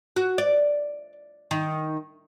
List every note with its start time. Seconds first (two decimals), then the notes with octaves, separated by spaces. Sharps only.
0.16 F#4
0.38 D5
1.51 D#3